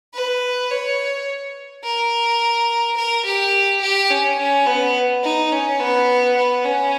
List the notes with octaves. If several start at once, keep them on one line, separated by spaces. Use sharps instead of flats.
B4
C#5
A#4
A#4
G4
G4
C#4
C#4
B3
D#4
C#4
B3
B3
C#4